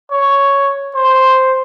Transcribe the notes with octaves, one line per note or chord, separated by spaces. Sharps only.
C#5
C5